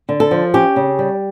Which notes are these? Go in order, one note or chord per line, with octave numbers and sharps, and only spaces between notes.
D3
A4
F3
C#4 G4
C#3
G3